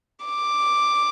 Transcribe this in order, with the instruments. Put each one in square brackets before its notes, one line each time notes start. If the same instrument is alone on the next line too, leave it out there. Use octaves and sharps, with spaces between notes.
[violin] D6